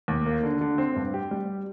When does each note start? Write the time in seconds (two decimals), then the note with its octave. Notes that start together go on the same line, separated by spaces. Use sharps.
0.08 D#2
0.26 A#3
0.43 D3
0.61 D3
0.78 C4
0.96 G2
1.14 G4
1.31 G3